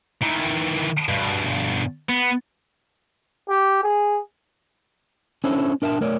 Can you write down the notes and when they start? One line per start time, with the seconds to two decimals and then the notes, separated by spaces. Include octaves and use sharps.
0.22 D#3 E3
1.09 G2 B2
2.09 B3
3.49 G4
3.83 G#4
5.44 C#4 D4 E4 A4 C5 C#5
5.82 D4 A#4 E5 G5 A5
6.01 A3 A#4 C#5 D5